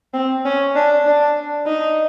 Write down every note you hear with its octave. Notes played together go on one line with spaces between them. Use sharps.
C4
C#4
D4
D4
D#4